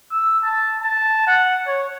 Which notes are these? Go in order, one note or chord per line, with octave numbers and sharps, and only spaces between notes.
E6
A5
A5
F#5
C#5